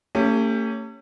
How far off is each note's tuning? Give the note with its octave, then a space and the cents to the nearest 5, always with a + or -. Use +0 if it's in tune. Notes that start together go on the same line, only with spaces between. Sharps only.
A3 +45 C#4 +0 G4 +20